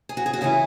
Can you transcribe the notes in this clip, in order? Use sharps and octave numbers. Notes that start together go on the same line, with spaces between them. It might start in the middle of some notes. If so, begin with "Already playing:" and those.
G#4
F#4
G#4
F#4
C#3 E3 C#4 E4 G#4